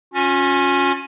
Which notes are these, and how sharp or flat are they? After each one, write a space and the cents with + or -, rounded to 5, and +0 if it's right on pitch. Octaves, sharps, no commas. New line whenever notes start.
C#4 +0 F4 +45